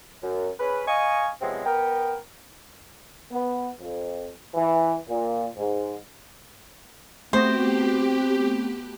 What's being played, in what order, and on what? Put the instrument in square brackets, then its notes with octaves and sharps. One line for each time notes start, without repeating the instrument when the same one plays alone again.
[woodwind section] F#2
C#4 G#4 B4
D#5 F5 G#5 C#6
C3 F3 F#3 G#3 B3 C4
B3 A#4 G5
[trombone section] B3
F2
E3
A#2
G#2
[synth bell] A3 B3 F#4 [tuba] C4 [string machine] G4 [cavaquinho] C5